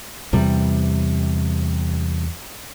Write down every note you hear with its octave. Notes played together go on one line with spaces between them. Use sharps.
E2 C3 G3